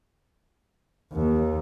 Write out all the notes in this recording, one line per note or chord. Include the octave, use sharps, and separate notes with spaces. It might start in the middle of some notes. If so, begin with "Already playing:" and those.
D#2